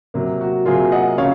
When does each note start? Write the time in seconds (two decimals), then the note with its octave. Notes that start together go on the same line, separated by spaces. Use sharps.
0.14 C3 F#3 A#3
0.41 F#4
0.66 C3 F#3 A#3 F4 G#4
0.92 D#5 F#5
1.17 C#3 F#3 C#5 F5